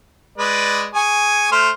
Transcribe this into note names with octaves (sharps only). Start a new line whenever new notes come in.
G#3 B4 D5
G#4 G#5 C#6
A3 C5 F6